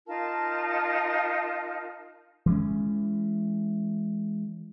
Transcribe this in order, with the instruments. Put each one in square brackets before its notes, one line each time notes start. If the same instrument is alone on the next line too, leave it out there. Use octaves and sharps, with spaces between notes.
[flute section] D#4 F4 A#4 A5
[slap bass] E3 G#3 C#4